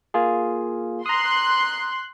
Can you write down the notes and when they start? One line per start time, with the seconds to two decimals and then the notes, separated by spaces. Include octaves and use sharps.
0.14 A#3 F4 G#4
1.06 A#5 C6 D#6 F#6